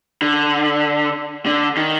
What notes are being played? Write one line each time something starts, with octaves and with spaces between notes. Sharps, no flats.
D3
D3
D#3